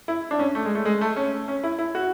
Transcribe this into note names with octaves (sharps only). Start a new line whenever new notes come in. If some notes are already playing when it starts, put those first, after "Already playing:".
E4
D4
C#4
A3
G#3
A3
G#3
A3
C#4
C#4
E4
E4
F#4